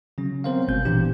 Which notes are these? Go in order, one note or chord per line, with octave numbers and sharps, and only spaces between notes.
C#3 F#3 C#4
B3 C4 A#4 C5 C#5 F5
G1 B2 G#3 G6
A#2 E3 B3 D4 G4